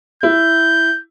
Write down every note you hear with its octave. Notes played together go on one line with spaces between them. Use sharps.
E4 G6